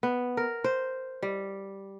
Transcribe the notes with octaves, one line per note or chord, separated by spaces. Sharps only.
B3
A#4
C5
G3